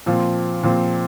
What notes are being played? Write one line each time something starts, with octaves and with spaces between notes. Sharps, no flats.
A#2 F3 C4
A#2 F3 C4